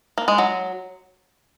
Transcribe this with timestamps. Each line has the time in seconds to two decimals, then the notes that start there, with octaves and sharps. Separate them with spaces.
0.18 A#3
0.28 G#3
0.38 F#3